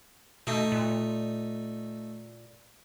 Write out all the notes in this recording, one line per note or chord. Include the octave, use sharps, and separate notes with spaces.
B2 A3 D#4
A#2